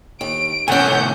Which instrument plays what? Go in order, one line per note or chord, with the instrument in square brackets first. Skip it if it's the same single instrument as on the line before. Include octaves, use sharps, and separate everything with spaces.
[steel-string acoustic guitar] D#2 [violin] D7
[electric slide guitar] A2 C3 G#5 [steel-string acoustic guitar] A3 C#4 [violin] F#5 G6